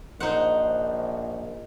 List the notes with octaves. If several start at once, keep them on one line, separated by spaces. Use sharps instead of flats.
A#1 D#4 C5 F#5